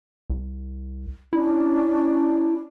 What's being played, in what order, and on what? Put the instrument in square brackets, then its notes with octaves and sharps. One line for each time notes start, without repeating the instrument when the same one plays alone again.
[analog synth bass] C2
[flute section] C#4 D4 [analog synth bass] E4